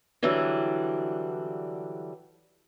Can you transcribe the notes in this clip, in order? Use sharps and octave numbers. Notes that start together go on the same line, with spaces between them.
D3 E3 F#3 G3 D4